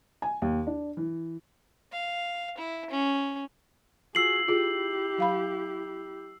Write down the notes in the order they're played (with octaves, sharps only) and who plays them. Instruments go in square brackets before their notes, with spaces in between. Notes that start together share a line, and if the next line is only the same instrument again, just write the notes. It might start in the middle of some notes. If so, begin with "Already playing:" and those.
[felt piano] G#5
D#2
D4
E3
[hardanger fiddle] F5
E4
C#4
[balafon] F4 [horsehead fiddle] F#4 G#4 [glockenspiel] E6 C7 F#7
[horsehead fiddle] E4 G4 [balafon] F4 G#4
[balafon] F#3 F5 B5